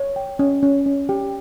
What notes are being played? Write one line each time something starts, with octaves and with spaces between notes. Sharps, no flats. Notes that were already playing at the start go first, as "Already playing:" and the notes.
Already playing: C#5
G5
C#4
C#4
C#4
G4